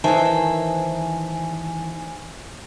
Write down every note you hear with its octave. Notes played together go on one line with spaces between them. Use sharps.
D#3 E3 C5 E5 G#5 A5